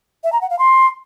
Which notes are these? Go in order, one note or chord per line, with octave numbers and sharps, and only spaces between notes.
E5
A#5
F#5
F5
C6